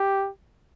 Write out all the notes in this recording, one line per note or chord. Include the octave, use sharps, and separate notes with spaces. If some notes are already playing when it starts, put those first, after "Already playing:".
Already playing: G4